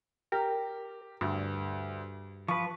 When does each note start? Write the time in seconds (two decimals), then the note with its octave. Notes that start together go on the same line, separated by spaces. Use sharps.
0.32 G4 A#4
1.21 D2 G2
2.48 F3 B4 C#6